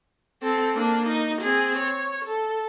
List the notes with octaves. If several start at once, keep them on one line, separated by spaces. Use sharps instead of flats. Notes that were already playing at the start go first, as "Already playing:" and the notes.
C4 A4
A#3 D4
D#4
C4 G#4
C#5
A4